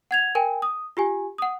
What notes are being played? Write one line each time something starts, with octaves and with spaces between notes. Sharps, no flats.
F#5 G#6 F7
A#4 G5 G#5
D#6
F4 G4 G#5
F#5 D#6